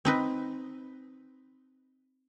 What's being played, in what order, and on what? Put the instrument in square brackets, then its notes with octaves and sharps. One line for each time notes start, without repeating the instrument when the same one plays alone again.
[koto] C4 D#4 B4